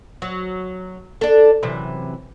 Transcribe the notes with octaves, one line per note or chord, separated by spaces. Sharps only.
F#3
D4 A4
F#2 C3 E3